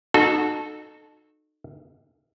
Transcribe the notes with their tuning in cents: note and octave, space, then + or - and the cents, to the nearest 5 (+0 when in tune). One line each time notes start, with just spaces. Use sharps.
D#4 -30 F#4 -25 A4 -10